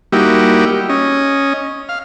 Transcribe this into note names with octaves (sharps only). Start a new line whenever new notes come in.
G3 A#3 D#4 E4 F#4 G4
C#4 D#5
F5